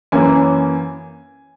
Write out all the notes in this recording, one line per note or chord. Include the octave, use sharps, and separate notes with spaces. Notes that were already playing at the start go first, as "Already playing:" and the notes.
F#2 E3 A#3 C#4 G#5